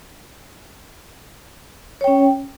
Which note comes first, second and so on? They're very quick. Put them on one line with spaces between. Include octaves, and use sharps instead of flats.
C#5 G5 C#4